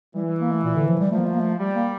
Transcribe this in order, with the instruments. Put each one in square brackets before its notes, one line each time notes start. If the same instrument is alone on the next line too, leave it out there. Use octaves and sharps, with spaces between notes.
[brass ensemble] E3 [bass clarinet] G3
[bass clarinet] A#3
A3
A#2
D3
F3
G3
[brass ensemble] F3 [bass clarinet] A3
[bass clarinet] A#3
A3
A#3
A3
[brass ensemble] G3
[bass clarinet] A#3